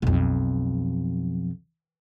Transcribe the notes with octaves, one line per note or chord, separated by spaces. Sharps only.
B1 F2